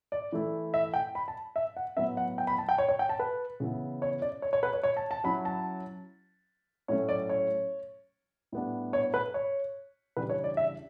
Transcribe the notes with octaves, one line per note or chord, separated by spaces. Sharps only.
D5
E3 A3 E4
E5
G5
B5
A5
E5
F#5
A2 F#3 B3 E5
F#5
G5
B5
A5
G5
C#5
C#5
G5
A5
B4
C#3 E3 B3 E4
C#5
D5
C#5
C#5
B4
C#5
C#5
A5
A5
F#3 C#4 E4 B5
A5
A2 F#3 A3 C#4 C#5
D5
C#5
A2 G3 B3 D4
C#5
B4
C#5
C#3 E3 G3 D4 B4
C#5
D5
E5